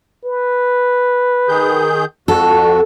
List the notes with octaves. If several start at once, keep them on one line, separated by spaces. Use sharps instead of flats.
B4
D#3 G#4 G6
F2 F#4 A4